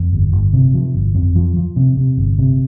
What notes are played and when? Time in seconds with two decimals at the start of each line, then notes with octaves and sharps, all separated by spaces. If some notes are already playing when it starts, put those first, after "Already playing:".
Already playing: F2
0.13 G1
0.32 G1
0.53 C3
0.74 F3
0.94 G1
1.15 F2
1.36 F3
1.56 F3
1.76 C3
1.97 C3
2.17 G1
2.38 C3